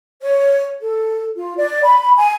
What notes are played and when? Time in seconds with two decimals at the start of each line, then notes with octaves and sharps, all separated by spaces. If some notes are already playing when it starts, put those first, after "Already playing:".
0.22 C#5
0.80 A4
1.37 F4
1.58 D5
1.83 B5
2.17 G#5